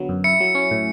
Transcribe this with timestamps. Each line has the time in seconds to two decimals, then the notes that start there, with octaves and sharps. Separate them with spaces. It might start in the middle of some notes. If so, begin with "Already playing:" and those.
Already playing: D3 F#3 B3
0.09 F#2
0.24 E4 C#7
0.40 F#3
0.55 C#4
0.71 A2